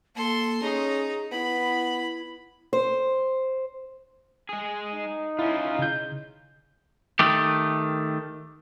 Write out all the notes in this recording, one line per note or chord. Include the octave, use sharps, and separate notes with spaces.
A#3 A4 C6
C#4 D#4 G#4
B3 E4 B5
C5
G#3 G#4
D#4
C#4 E4 F4
C#3 G6
D#3 A3 G4